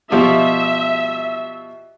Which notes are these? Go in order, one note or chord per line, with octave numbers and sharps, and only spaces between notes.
B2 F3 G4 E5